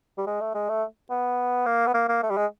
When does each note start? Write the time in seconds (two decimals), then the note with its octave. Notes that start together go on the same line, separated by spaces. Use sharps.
0.18 G3
0.27 G#3
0.41 A3
0.54 G#3
0.69 A3
1.10 B3
1.66 A#3
1.87 B3
1.94 A#3
2.09 A#3
2.23 A3
2.30 G3
2.37 G#3